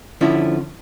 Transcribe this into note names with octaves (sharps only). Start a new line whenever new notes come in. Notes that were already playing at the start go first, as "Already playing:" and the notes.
D3 F3 C#4 E4